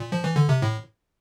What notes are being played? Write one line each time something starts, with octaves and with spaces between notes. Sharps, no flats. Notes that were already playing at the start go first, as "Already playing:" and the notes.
Already playing: A#2
F3
E3
D3
C3
A2